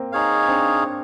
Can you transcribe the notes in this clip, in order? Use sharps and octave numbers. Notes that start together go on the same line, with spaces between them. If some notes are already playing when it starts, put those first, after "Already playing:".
Already playing: A#3 C4
D#4 G#4 C#5 F5
C4 D4